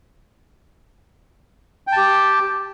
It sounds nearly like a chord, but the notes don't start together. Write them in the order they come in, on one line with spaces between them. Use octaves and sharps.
G5 A5 G4